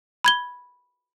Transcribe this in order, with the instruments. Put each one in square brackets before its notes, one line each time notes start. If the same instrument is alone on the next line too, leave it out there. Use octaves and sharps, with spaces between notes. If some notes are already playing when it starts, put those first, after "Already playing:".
[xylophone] B5 G#6 G7